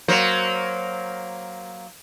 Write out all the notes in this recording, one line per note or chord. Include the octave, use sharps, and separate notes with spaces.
F#3 A#3 C5